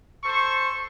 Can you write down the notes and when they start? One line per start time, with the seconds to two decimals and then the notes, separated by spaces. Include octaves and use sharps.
0.23 A4 C5 C#6